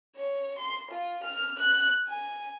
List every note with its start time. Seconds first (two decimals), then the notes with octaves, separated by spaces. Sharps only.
0.16 C#5
0.58 C6
0.91 F4
1.23 F6
1.58 F#6
2.07 G#5